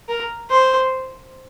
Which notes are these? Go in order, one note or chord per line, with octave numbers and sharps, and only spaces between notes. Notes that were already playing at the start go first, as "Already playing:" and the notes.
A#4
C5